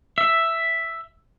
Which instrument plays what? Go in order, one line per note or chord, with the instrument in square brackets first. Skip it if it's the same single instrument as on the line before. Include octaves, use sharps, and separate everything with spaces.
[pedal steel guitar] E5